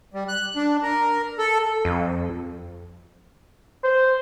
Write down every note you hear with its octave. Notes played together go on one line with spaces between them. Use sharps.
G3
F#6
D4
A#4
A4
F2
C5